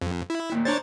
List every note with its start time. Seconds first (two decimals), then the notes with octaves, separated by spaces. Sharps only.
0.01 F2
0.30 E4
0.51 D#2 A#2
0.65 D4 C5 C#5 A#5 A6